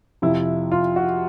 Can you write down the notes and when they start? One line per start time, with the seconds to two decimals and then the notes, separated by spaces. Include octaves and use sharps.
0.22 F2 C3 F3 E4
0.72 F4
0.96 F#4